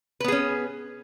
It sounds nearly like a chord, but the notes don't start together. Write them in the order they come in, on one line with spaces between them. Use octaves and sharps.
B4 B3 G#4 C#4